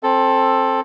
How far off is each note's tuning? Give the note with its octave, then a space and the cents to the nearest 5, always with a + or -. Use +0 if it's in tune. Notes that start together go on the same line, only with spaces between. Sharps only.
C4 +15 A4 +0